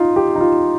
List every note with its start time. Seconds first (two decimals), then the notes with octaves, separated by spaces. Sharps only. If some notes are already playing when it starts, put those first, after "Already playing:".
Already playing: D#4 F4
0.16 G4
0.36 D#4
0.41 F4